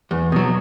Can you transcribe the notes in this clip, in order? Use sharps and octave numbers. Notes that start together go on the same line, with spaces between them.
E2
B2 F#3